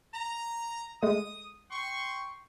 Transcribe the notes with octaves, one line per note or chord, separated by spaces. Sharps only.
A#5
G#3 A3 D#6
G5 C6 C#6